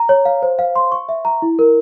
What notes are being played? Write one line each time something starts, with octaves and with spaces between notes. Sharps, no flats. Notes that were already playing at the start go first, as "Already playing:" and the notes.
Already playing: A#5
C#5
F5
C5
F5
C6
C#6
E5
A#5
E4
A#4